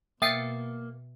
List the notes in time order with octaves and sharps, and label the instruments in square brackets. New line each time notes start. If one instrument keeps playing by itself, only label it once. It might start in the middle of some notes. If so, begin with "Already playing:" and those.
[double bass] B2 [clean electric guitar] A#3 [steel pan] E5 G5 D#6 [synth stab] A6 C7 C#7